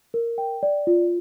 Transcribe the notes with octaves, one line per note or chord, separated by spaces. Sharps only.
A#4
G5
D5
F4